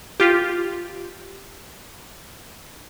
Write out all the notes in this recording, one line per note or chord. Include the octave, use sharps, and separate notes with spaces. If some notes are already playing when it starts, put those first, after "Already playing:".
F4 G4